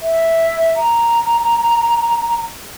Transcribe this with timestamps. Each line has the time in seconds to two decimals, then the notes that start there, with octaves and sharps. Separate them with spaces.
0.02 E5
0.76 A#5